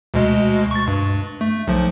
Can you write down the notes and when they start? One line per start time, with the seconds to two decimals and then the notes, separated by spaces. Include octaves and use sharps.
0.14 D2 B2 G#3
0.71 C#6 A6
0.88 G2
1.41 A3
1.67 B1 F3